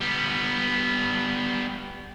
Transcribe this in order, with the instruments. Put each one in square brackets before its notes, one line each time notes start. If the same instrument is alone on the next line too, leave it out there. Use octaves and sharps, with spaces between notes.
[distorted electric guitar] G3 B3